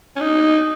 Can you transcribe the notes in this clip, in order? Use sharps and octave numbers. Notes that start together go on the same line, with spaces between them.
C#4
D#4